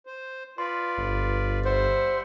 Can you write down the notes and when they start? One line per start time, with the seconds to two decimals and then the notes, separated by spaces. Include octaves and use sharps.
0.06 C5
0.58 F4 B4 D5 C6
0.98 G1
1.65 G3 C5 E5 F#5